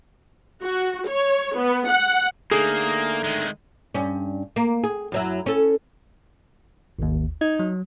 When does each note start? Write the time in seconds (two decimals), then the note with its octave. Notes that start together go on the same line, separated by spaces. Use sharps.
0.61 F#4
1.08 C#5
1.57 B3
1.89 F#5
2.51 D3 A3 A#3 D#4 G#4
3.24 D#3 G#3
3.95 G2 C#4
4.56 A#3
4.83 G#4
5.12 F#2 F#3 E4
5.46 C#4 A4
6.99 G#1 D#2
7.41 D#4 G#6
7.59 F#3